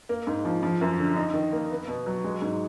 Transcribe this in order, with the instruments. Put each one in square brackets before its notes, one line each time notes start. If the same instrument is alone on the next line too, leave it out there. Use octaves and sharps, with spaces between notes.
[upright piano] A#3
G#2
F3
F3
F#2
D3
D#4
D#3
A#3
B3
B2
F#3
G#3
G#2